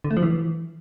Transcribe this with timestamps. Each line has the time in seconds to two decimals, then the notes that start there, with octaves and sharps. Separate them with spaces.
0.04 D3
0.11 A3
0.17 F3
0.23 E3